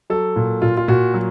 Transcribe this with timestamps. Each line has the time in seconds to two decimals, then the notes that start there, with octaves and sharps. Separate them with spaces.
0.10 F#3 A4
0.36 A#2
0.62 A#2 F4
0.77 F4
0.88 A#2 F#4
1.14 F#3